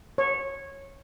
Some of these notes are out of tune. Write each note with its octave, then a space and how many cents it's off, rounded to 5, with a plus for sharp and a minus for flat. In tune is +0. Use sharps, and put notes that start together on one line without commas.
C#5 -15